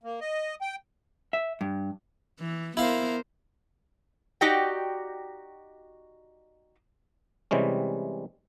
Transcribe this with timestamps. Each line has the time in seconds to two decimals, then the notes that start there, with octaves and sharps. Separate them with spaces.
0.03 A#3
0.21 D#5
0.61 G5
1.33 E5
1.61 G2
2.40 E3
2.77 B3 E4 A#4 C5 F5
4.41 D#4 F#4 G4 D5 D#5 G5
7.51 C3 E3 G3 G#3 C#4